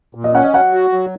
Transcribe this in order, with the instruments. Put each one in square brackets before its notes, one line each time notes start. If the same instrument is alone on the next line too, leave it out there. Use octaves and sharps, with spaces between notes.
[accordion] A#2
[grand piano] D#5
[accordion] C#4 [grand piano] F#5
[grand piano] D#5
[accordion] F#3 [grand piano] F#5
[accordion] F#4
F#3